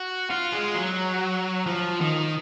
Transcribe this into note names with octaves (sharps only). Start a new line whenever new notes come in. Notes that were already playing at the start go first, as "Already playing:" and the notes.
Already playing: F#4
F4
G#3
F#3
F3
D#3